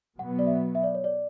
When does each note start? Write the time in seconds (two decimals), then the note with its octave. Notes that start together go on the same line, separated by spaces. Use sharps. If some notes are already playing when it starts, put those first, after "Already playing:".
0.18 B2 F#3 B3 F#5
0.39 D5
0.47 E5
0.75 E5
0.84 D5
0.95 C#5
1.04 D5